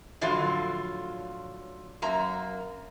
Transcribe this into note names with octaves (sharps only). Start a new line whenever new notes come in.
A2 D3 F3 F#3 F4
F#2 A#3 A#5